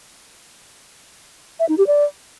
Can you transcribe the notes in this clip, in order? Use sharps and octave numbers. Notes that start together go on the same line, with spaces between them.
E5
D#4
G4
D5